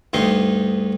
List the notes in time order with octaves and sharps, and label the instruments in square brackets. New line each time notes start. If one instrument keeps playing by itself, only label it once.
[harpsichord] D2 G2 D#4 C6